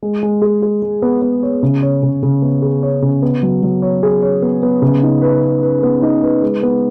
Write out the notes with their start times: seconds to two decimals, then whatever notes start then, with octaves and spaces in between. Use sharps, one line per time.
0.03 G#3
0.23 G#3
0.42 G#4
0.62 G#4
0.82 G#3
1.02 B3
1.22 B3
1.43 C#5
1.63 C#3
1.82 C#5
2.03 C#3
2.23 C#3
2.42 B3
2.62 G#4
2.83 C#5
3.02 C#3
3.22 B3
3.43 F#3
3.63 F#3
3.82 C#5
4.03 G#4
4.22 C#5
4.42 B3
4.63 B3
4.82 C#3
5.03 D#4
5.22 B4
5.43 B4
5.63 B4
5.83 B3
6.02 D#4
6.22 B4
6.42 G#3
6.63 B3